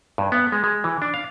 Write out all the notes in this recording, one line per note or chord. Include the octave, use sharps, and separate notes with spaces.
G2
B3
G#3
G#3
E3
D4
F5